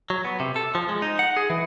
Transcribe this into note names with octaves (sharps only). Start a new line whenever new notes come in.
F#3
B3
C3
A4
F3
G#3
D#4
F#5
G#4
E3